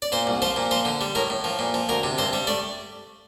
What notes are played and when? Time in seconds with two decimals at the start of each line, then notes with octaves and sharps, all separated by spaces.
0.02 D5
0.12 A#2 C5
0.27 C2
0.42 F3 C5
0.56 A#2
0.71 F3 C5
0.85 D3
1.01 G3
1.15 A2 A#4
1.30 A2
1.44 F3
1.59 A#2
1.74 F3
1.89 D2 A#4
2.03 C3
2.18 G2 C5
2.33 G3
2.47 A3 D5